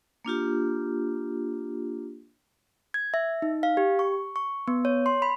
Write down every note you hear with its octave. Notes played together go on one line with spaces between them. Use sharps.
A#3 D4 F4 G4
G#6
E5
D#4
F5
G4
C#6
C#6
B3
C#5
C6
B5